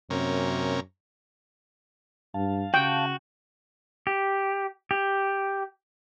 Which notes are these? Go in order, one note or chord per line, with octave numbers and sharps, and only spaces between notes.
F#2 C3 A#3 C#4
G2 F5 A5
C#3 F#4 G5
G4
G4